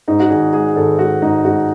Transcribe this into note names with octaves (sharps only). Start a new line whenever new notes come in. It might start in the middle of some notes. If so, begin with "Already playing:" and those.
G#2 D#4
F#4
G#1 G#4
G#3 G#4
G#1 A4
G#3 F#4
G#2 D#4
G#2 F#4